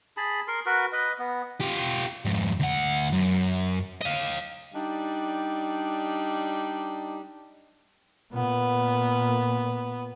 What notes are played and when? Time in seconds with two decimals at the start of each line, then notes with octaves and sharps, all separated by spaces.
0.17 G#4 A5 B5
0.48 A#4 C6
0.66 F#4 A#4 B4
0.92 B4 D#5
1.19 B3
1.60 F4 G4
2.25 F2 G#2
2.60 D2 F#5
3.12 F#2
4.01 D#5 F5
4.74 G3 D4 D#4
8.34 A#2 B3